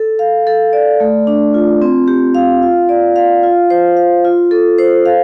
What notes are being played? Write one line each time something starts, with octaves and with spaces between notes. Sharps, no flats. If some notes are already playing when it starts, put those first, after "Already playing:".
Already playing: A4
F5
A4
D5
A3
D4
F4
C4
G4
F5
F4
D5
F5
F4
C5
F5
F4
A4
C5
F5